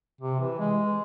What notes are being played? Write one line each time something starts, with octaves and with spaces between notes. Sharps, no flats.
C3
E3
G#3